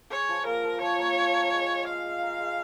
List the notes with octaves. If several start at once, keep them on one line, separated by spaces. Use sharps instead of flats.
G#4 C#5
F3
A#3 A#4
F3
F3 C#5
A#3
F4
A#4
G#3
F4
G#3 F5
G#3
A#4
G#3